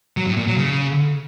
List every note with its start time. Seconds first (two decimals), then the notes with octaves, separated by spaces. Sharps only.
0.17 F#3
0.27 A2
0.37 A#2
0.47 F#3
0.56 C#3